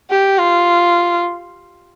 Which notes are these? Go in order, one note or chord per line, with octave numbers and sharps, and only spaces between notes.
G4
F4